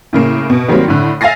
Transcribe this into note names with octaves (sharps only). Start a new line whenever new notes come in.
A2 C#3 A#3
B2
D#3 F#3 G3 A#3 C4
A2 D3
E5 F5 G#5 A6 A#6 C7